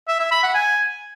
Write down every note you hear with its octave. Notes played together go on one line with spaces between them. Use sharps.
E5
E5
B5
F#5
G#5